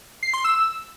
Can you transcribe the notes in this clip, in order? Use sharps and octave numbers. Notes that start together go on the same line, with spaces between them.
C7
C6
E6